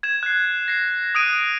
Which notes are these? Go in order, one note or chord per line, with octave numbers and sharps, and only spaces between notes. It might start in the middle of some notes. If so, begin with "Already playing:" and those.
G#6 E7
F#6 C7
A#6 C7
D#6 F#6 D7 D#7